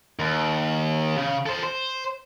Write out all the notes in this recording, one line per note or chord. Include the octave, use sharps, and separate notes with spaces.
D#2
C#3
A4 C5
C5